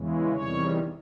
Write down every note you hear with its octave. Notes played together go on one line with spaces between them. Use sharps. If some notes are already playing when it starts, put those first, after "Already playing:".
Already playing: E2 C#3 E3 G#3
E2 C3 D#3 G3 C#5